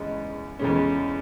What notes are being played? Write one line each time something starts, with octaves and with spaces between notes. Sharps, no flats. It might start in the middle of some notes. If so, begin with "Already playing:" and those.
Already playing: E2 C#3 G#3 C#4
E2 C#3 G#3 C#4